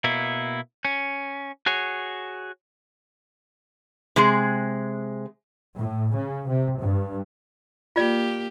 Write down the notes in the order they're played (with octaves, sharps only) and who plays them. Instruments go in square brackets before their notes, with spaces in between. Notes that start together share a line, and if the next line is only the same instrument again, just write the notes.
[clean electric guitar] B2 A#3 B3 E4
C#4
F#4 G#4 C#5
[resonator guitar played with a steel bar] C3 G#3 G#4
[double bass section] A2
C#3
C3
G2
[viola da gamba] A#3 G4 [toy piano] F4 D5